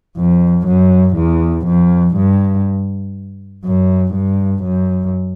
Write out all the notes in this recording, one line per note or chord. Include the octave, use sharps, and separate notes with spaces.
F2
F#2
E2
F2
G2
F#2
G2
F#2